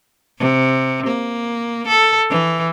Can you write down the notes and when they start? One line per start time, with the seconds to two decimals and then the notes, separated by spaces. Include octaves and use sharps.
0.38 C3
1.07 A#3
1.87 A4
2.30 E3